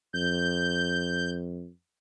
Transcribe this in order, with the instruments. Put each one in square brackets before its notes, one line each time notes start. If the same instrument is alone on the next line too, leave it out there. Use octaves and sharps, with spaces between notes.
[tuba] F2 [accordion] G6